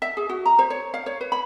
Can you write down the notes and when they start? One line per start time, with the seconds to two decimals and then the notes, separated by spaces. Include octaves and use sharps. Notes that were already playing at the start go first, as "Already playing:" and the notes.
0.02 E5
0.17 G#4
0.29 F#4
0.46 A#5
0.59 C5
0.70 C#5
0.94 F5
1.06 C#5
1.21 B4
1.32 B5